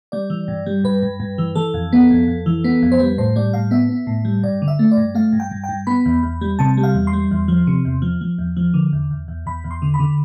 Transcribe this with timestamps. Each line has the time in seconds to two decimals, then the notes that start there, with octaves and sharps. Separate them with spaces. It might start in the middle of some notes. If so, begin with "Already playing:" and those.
0.12 G3 D5
0.30 E3
0.48 G2
0.66 G3
0.84 G2 B4
1.02 G2
1.20 G2
1.38 E3
1.55 E3 A4
1.74 F2
1.93 B3
2.11 F2
2.27 F2
2.46 E3
2.64 B3
2.82 F2
2.92 C5
3.00 G3 B4
3.18 A2 C5
3.36 G3 D5
3.53 A2 F5
3.71 B3 E5
3.89 B3
4.07 A2
4.25 G3
4.43 G2 D5
4.62 D3
4.68 E5
4.79 A3
4.91 D5
4.97 G2
5.15 A3 F5
5.33 G2
5.40 G5
5.51 G2
5.64 G5
5.69 G2
5.87 B3 B5
6.06 E2
6.23 E2
6.41 G3
6.59 C3 A5
6.77 G3
6.83 F5
6.94 E2
7.07 C6
7.13 G3
7.31 E2
7.48 F3
7.67 C3
7.85 E2
8.02 F3
8.21 F3
8.38 E2
8.57 F3
8.74 D3
8.93 E2
9.11 E2
9.28 E2
9.46 E2 B5
9.64 E2
9.71 C6
9.82 D3
9.94 B5
10.00 D3